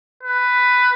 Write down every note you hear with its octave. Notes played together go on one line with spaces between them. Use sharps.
B4